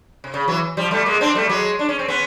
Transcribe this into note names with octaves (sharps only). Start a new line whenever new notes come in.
C3
C#3
E3 F#3
F3 G3
G3 A3
G#3 A#3
C4 D4
G3 A3
F#3 G#3
D4
C#4
C4
B3 C#4